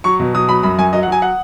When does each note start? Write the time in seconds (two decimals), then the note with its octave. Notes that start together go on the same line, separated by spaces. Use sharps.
0.04 F#3 C#6
0.20 B2
0.34 F#3 D#6
0.49 F#3 B5
0.63 F#2 B5
0.78 F#2 G#5
0.93 F#3 D#5
1.03 F#5
1.08 F#3 G#5
1.22 F#5